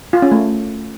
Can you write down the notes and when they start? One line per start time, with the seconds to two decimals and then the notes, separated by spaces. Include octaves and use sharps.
0.13 F4
0.22 C#4
0.32 A3